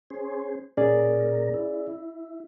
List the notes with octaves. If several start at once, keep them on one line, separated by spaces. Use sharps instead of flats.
C#4 G#4 C5
A#2 C#4 G#4 A#4 D5
E4